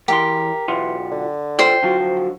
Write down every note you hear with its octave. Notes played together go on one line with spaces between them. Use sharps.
E2 E3 G4 A#4 C6
B1 E3 F4 F#5
D3
F4 A4 C5 D5 G5
D3 F#3 F4 F#4
F3